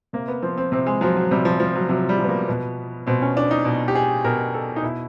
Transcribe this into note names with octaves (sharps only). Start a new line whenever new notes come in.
C3 A#3
B3
F3 C4
C4
C3 C4
G#3
F3 F#3
F#3
C3 G3
F3
F3
F#3
C3 F#3
G3
F3
B3
A#3
B2 B3
B2 C4
C#4
D4
D#4
B2
G4
G#4
B2 A#4
A4
D#4
B2 E4